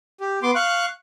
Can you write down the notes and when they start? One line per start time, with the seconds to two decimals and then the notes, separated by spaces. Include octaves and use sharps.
0.20 G4
0.43 B3 C6 D6
0.55 F5 C#6 F#6